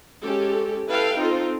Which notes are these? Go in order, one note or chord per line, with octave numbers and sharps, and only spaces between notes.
G#3 C#4 G4 A4
E4 A4 B4 F5 G5
C4 D#4 F4 A4